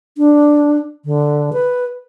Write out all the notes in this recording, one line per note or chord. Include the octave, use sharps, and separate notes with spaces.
D4
D3
B4